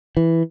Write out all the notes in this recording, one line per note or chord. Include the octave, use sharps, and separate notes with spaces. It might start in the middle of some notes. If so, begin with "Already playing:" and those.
E3